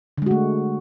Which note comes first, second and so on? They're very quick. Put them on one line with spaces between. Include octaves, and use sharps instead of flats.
D3 G#3 F#4 A3